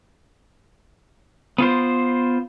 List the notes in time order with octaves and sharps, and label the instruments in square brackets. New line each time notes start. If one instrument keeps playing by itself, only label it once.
[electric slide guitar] B3 F4 C5